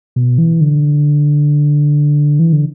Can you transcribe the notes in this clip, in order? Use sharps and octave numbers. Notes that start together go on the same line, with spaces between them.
B2
E3
D3
E3
D3